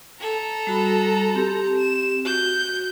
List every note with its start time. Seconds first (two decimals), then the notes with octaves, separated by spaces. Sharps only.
0.20 A4 A#5
0.67 G3 F#4 B5
1.35 C4 G4
1.78 E7
2.25 F#4 G6